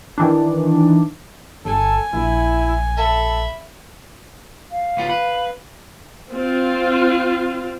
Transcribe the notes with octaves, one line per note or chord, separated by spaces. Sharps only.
D#3 E3 D4
G1 A4 G#5
A#1 E4
A4 E5 B5
F5
C#2 B3 F4
B4
C4 F4